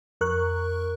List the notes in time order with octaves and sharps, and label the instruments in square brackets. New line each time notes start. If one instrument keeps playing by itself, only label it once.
[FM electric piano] F2 A#4 C#6 F#6